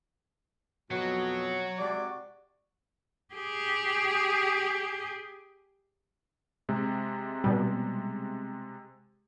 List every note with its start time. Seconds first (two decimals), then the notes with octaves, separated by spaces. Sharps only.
0.91 F2 B2 F#3 F#4 C#5 F#5
1.79 C3 G#3 F#4 D5
3.34 G4 G#4
6.69 C3 G#3
7.44 B2 G3